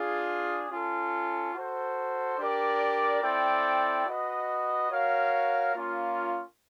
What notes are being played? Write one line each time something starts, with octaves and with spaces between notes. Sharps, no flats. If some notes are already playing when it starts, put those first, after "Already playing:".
Already playing: D4 F4 G#4
C#4 F4 A4
F#4 A4 C5
D4 G4 A#4 D5
C4 E4 A4 D5 G5
F#4 B4 D#5
F#4 A#4 C#5 F5
A#3 C#4 F4